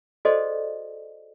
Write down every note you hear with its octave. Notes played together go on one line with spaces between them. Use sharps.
F#4 G#4 A4 C5 D5 D#5